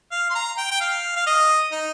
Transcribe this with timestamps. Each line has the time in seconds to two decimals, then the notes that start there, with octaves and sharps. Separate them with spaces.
0.11 F5
0.30 C6
0.35 A#5
0.58 G5
0.71 G5
0.81 F5
1.16 F5
1.27 D#5
1.72 D#4